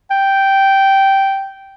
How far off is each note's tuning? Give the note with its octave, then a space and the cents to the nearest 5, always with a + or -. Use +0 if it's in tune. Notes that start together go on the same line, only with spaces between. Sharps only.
G5 -10